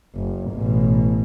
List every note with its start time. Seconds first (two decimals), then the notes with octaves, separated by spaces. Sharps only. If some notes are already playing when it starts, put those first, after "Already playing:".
0.15 F#1
0.52 A1 B2